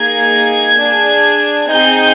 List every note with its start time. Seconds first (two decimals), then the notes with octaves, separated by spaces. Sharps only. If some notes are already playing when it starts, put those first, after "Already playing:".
Already playing: A#3 D#4 G#4 G#6
0.79 D4 G#4
1.70 C4 D#4 G#4 G6